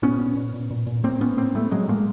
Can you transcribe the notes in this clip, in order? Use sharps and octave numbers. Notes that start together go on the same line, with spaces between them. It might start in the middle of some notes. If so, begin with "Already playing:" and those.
A#2 B3 C#4
A#2
A#2
A#2
A#2
A#2
A2 A#3 C4
A2 B3 C#4
A2 A#3 C4
A2 G3 A3
A2 F#3 G#3
A2 G#3 A#3